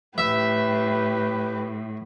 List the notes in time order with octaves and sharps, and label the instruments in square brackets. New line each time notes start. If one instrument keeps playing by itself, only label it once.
[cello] A2 [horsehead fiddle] G4 B4 [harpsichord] E5